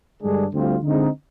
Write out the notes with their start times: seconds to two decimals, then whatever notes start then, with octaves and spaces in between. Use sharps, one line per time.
0.21 G2 D3 G#3 D4 G#4
0.53 D2 D3 G3 C4 F4
0.83 D3 G#3 C4 D#4